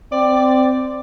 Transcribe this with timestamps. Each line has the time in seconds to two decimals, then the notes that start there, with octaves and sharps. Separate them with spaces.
0.12 C4 D5